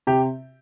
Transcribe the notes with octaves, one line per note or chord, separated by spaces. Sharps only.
C3 G4